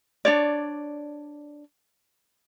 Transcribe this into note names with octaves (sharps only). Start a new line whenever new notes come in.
D4 C#5 D5